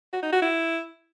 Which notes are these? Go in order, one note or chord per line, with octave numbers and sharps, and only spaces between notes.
F#4
D#4
F#4
E4